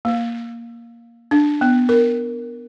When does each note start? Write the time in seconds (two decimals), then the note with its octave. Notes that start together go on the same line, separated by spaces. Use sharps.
0.05 A#3
1.31 D4
1.61 B3
1.89 A#4